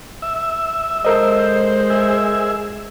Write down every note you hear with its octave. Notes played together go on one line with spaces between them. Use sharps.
E5
G#3 A4 A#4 C5 D#5
G#4 E5